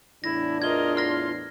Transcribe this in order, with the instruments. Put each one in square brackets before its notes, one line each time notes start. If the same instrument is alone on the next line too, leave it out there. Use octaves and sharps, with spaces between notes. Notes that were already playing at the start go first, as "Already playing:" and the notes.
[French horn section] E2 A2 D4 [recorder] E4 [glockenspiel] A#6
[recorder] F4 [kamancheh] A#4 D#5 [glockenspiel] G#6 G7
[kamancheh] C6 [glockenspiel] F6 A#6